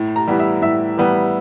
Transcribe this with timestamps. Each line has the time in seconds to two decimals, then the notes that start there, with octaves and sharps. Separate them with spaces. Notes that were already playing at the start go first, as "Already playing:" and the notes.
Already playing: A2
0.16 A#5
0.27 E3 G3 B3
0.40 E5
0.62 A2 E5
0.97 E3 G3 B3